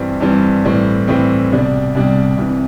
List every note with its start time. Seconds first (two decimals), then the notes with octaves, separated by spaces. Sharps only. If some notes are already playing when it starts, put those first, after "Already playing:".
Already playing: G2 E3 G3 C4
0.21 G2 E3 G3 C4
0.65 A2 E3 G3 C4
1.08 A2 E3 G3 C4
1.51 C2 B2 G3 D4
1.95 C2 B2 G3 D4
2.37 C2 C3 E3